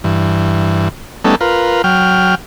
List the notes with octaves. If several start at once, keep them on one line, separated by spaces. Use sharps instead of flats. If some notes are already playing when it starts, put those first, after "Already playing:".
G2 E3
G3 A3 B3 C#4 D#4 A4
F4 A#4 B4
F#3 G5 F6